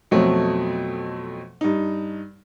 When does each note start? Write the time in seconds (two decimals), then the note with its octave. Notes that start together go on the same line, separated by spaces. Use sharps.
0.11 F2 B2 F#3 A3 C4
1.61 G2 D#4